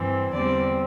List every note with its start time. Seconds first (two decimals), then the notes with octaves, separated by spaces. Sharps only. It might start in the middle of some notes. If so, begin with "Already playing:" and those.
Already playing: G2 E3 C4
0.31 E2 D3 G3 C4 D5